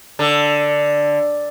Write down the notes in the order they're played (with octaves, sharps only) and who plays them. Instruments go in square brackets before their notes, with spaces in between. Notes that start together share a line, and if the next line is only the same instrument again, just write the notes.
[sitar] D3